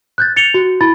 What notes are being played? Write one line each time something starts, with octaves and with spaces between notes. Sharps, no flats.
F#6 G6 A6
A6 C#7 F7 G7
F#4
E4 B5 A6